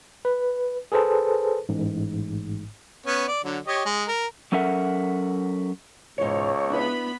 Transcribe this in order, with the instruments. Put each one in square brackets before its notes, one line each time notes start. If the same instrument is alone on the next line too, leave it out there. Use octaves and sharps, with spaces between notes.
[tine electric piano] B4
G#4 A4 B4 C5 A5
A1 G#2
[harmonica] B3 C#4
D5
D3 F#3
G4 C#5 D#5
G#3
A#4
[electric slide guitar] F#3 C#4 A4 A#4 E5 F#5
[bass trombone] C#2 [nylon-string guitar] G#2 B2 E3 [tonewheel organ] C#5
[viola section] B3 B5 [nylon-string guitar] D4 E4 B4